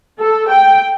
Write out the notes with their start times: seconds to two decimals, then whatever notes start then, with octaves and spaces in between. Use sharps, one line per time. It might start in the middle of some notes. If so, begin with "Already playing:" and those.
0.20 A4
0.51 G5